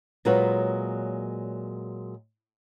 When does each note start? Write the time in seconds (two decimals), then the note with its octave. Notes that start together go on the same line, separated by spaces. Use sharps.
0.25 A#2 F#3 G#3 F4 B4 C#5